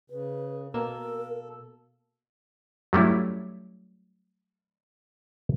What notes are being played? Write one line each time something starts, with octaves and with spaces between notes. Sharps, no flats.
C#3 B4
B2 A#3 A4 A#4 E6
F#3 G3 A3 C#4 E4